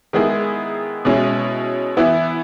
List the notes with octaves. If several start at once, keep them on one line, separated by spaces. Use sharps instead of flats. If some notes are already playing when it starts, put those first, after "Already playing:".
D#3 G#3 B3 E4 G#4
B2 G#3 C#4 E4
E3 B3 E4